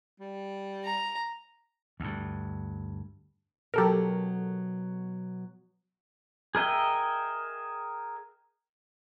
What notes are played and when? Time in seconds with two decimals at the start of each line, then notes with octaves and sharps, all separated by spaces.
0.20 G3
0.84 A#5
2.00 D2 G2
3.74 B2 F#3 G4 A4 A#4
6.55 G#4 A#4 D#5 E5 G5